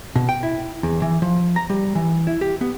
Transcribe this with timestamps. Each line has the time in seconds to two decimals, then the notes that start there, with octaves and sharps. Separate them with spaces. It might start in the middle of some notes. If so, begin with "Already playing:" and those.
0.16 B2
0.29 G5
0.43 E4
0.83 E2
1.02 E3
1.22 F3
1.56 A#5
1.70 G3
1.95 E3
2.27 E4
2.41 G4
2.61 B3